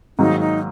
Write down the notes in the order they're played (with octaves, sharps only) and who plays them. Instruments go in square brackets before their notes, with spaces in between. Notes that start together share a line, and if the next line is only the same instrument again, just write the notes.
[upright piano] G#2 D#3 F#3 A#3 [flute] D#4
[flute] D#4